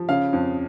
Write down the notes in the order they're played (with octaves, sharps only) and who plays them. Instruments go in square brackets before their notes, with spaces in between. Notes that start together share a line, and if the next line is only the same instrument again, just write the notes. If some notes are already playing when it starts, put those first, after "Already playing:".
Already playing: [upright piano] F3
C#3 F5
F2